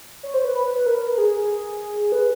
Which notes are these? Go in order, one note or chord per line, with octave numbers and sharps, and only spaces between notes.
C#5
C5
B4
B4
A#4
G#4
B4